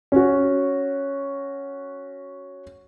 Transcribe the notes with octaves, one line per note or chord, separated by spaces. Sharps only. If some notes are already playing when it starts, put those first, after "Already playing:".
C#4 F#4